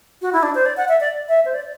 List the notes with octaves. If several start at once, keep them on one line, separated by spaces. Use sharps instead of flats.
F#4
E4
D4
C5
D5
F#5
E5
D5
E5
C5
D5